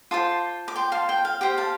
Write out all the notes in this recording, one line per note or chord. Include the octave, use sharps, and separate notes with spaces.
F4 C5 A5 D6
D6
G5 C6
F5 A5
G5
F5
G4 C5 G5
F5 A5